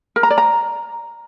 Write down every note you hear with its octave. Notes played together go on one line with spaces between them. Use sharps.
A#4
A#5
D5
A#5